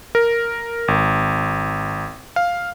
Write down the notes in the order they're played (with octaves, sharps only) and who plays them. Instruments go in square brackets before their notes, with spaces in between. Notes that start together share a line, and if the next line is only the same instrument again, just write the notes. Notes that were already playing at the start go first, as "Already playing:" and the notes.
[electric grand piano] A#4
G#1
F5